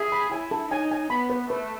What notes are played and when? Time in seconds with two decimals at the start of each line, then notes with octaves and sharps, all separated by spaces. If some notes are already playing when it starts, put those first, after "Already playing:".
Already playing: G#4 E5
0.12 B5
0.32 E4 G#5
0.51 A4
0.71 D#4 G#5
0.91 G#5
1.10 B3 B5
1.30 B4
1.49 A3 B4